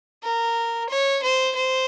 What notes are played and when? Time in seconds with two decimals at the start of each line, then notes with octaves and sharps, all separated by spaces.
0.23 A#4
0.89 C#5
1.23 C5
1.55 C5